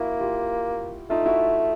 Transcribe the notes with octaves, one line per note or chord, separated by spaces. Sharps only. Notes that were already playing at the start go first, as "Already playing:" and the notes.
Already playing: A#3 E4 F#4
F4 G4
A3 D#4 F4
E4 F#4